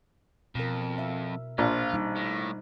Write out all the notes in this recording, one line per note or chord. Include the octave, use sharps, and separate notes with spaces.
F2 B2 A#4
E5
A#1 F4 C5 F5
G3 D#4
A2